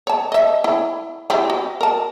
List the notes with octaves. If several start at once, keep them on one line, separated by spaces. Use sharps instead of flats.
C#5 A5
D#5 E5
E4
C4 E4 G4
F#4
A#4 A5